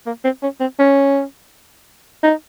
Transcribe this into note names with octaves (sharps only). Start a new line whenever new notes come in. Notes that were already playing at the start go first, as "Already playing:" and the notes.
A#3
C4
C#4
C4
C#4
D#4